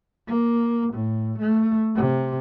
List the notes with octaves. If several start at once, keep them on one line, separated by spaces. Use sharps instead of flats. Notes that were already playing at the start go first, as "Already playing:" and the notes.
A#3
A2
A3
C3